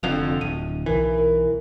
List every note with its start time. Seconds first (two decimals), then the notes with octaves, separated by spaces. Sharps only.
0.03 F1 F2 D3 F7
0.41 D1 D#7
0.86 B1 E3 A#4
1.18 A#4